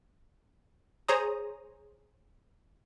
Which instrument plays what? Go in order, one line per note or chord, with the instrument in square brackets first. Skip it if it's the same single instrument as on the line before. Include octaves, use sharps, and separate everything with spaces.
[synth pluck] G#4 C5 C#5 A#5 D#6